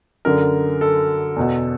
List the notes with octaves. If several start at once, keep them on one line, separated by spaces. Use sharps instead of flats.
F#2 D3 A#4
A4
E2 B2